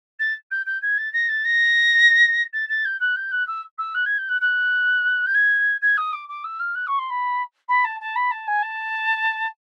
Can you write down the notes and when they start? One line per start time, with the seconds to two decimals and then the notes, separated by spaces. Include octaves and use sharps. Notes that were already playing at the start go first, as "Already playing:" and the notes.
0.19 A6
0.51 G6
0.66 G6
0.82 G#6
0.97 A6
1.12 A#6
1.28 A6
1.44 A#6
2.53 A6
2.69 A6
2.85 G6
3.00 F#6
3.16 G6
3.31 F#6
3.47 E6
3.78 E6
3.94 F#6
4.05 G#6
4.18 G6
4.28 F#6
4.41 F#6
5.26 G6
5.34 G#6
5.81 G#6
5.97 D#6
6.12 D6
6.28 D6
6.44 E6
6.59 F6
6.75 F#6
6.86 C#6
6.98 C6
7.09 B5
7.68 B5
7.84 A5
8.00 A5
8.15 B5
8.31 A5
8.47 G#5
8.62 A5